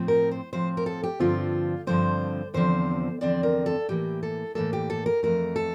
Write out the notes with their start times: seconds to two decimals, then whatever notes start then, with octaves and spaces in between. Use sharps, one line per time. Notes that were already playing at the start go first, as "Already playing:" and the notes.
Already playing: A2 F3 C4
0.08 A#4
0.31 C5
0.53 A2 F3 C4 C5
0.77 A#4
0.86 A4
1.03 G4
1.20 G2 D3 F3 C4 F4
1.87 G2 D3 F3 C4 C5
2.54 E2 D3 F3 C4 C5
3.21 E2 D3 F3 C4 D5
3.43 A#4
3.66 A4
3.89 A2 E3 A#3 G4
4.23 A4
4.55 A2 E3 A#3 A4
4.73 G4
4.90 A4
5.06 A#4
5.23 F2 E3 A3 A#4
5.56 A4